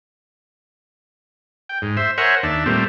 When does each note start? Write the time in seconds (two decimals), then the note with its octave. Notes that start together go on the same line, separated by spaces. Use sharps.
1.69 G5
1.82 G#2
1.97 C5 E5
2.18 A#4 C5 C#5 E5 F#5 G#5
2.43 D#2 D4 E5 A5
2.66 A#2 G3 A3 C4